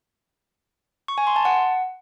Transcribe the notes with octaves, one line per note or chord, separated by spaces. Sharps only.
C#6
G#5
C6
A5
F#5